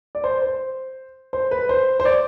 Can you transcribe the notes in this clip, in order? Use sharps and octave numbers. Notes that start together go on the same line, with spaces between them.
D5
C5
C5
C5
B4
C5
C5
D5